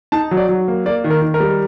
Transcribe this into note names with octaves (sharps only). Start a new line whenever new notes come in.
D#4 A5
F#3
D5
F#3
A#3
A#3 D5
D#3
A#4
D#3
A#4
G3